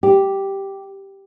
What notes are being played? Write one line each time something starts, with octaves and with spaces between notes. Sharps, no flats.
G4